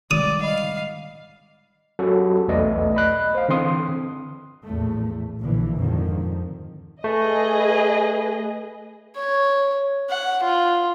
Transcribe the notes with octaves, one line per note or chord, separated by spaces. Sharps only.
D#3 G3 G#3 D5 D#6
D#5 F5 B5
F#3 C#4 F#4 G4 A4
B1 E2 A3 B4 D5 D#5
D#5 B5 F#6
C5 F5
D3 E3 C4 C6 D#6
A#1 E2 A2 A3
A#1 A#2 D3 E3
F2 G#2 D3 D#3 F3
A3 G#4 B4 D#5
C#5
F#5
F4